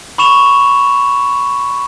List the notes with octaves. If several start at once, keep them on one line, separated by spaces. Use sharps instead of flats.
B5 C#6 E7 F7